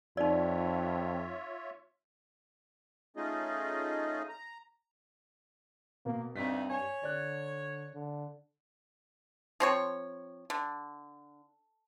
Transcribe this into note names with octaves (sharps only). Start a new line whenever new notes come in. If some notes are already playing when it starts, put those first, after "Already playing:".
F2 D#4 F4 C#5 D5 E5
A3 C#4 D#4 F4 G#4 D#5
A#5
B2 A#3
D2 G2 A3 C4 D#4 B6
C#5 G#5
D3 D5 F#6
D3
F3 C4 C#5
D3